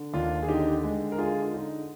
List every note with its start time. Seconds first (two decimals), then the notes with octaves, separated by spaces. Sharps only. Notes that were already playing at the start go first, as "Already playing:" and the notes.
Already playing: D3
0.13 D#2 D4 F4
0.42 G#4
0.48 D3 D#4 G4
0.83 G#3
1.12 A#4
1.18 D3 F4 G#4
1.42 F4
1.53 D3 D#4